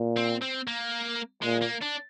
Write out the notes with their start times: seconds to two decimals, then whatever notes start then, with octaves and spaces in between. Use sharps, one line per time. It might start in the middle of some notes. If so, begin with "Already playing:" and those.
Already playing: A#2
0.17 C4
0.42 C4
0.68 A#3
1.43 A#2 G#3
1.62 A#3
1.81 D4